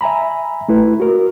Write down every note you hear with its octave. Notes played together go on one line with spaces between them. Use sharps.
E5 G#5 A#5 B5
A3 E4 B4
F#4 A#4